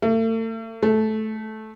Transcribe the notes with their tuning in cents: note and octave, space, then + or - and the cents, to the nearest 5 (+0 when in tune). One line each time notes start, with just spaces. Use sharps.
A3 +40
A3 -15